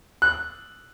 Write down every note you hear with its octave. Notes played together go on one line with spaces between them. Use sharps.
F#6